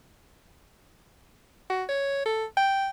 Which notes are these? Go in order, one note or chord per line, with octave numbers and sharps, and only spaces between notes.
F#4
C#5
A4
G5